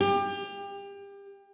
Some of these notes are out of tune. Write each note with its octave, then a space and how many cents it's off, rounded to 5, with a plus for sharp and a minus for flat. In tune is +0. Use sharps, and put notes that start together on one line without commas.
G4 +30